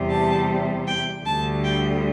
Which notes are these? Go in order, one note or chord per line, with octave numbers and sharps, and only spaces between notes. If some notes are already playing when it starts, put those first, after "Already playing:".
Already playing: E2 C3 G3
A5
G5
D2 D3 G3 A5
G5